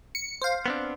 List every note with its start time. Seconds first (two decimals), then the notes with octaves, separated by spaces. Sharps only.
0.15 C#7
0.42 C5 F5
0.66 B3 C4 D4